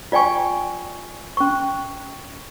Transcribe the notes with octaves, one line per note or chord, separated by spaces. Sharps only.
F4 D5 G5 G#5 C#6
C#4 C#6